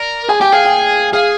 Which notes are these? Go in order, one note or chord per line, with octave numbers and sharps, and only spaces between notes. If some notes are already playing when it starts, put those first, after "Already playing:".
Already playing: A#4 D5
G#4 G#5
G4 G5
G#4 F5
G5
G#4 F5